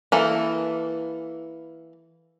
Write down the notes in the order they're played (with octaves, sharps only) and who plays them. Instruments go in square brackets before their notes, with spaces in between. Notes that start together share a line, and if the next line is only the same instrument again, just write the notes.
[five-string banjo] E3 A#3 A4